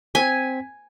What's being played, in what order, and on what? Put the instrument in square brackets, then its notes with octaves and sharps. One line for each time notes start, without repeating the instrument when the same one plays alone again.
[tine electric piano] C4 G#6 B6 [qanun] G#5